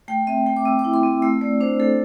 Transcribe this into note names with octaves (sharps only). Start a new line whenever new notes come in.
A3 G5
C4 E5
A3 G5
D6
C4 E6
D6
E4
C6
C4
A3 E6
A3 D5
D4 C5
A3 A4